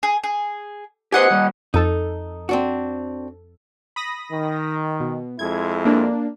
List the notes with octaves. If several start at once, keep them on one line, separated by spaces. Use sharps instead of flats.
G#4
G#4
G4 B4 C5 D#5 F#5 G#5
D#3 G3
F2 D#4 A4
C4 D4 F#4
B5 D#6 A#6
D#3
B2
F2 G#3 E4 G#6
A#3 D4